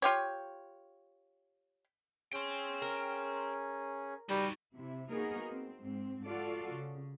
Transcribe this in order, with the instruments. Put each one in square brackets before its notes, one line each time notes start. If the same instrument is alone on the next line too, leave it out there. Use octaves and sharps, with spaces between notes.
[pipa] F4 G4 C#5
[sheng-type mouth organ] C#4 G#4 [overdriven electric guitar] G5 C6
[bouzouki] A#4
[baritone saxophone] G3 [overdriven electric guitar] D#4 F#4
[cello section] C3 E4
A#3 B3 D#4 F#4 G#4 A#4
C4
G#2 C4
F4 F#4 A4 D5 F5
C#3